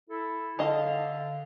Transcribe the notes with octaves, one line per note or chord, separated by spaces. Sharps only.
E4 A4
D3 D#5 F5 A5